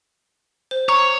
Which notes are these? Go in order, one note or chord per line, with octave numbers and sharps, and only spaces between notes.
C5
C#5 A#5 C#6